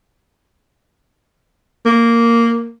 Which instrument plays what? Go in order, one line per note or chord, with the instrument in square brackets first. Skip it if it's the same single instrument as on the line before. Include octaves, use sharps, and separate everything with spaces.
[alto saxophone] A#3